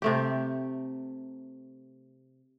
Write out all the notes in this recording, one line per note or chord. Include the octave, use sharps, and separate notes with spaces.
C3 A3 G4